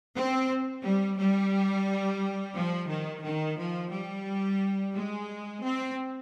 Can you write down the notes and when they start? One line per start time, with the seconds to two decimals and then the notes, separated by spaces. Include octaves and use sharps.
0.14 C4
0.82 G3
1.17 G3
2.54 F3
2.88 D#3
3.22 D#3
3.57 F3
3.90 G3
4.93 G#3
5.62 C4